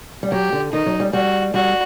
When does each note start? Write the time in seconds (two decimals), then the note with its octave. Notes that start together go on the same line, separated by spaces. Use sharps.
0.23 G3
0.32 F#3 G4
0.52 D3
0.73 D#3 D#4
0.86 F#3
1.00 G3
1.13 G3 F#4
1.54 G3 F#4